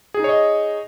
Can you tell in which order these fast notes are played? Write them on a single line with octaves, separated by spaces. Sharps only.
G#4 D#4 C#5 D#5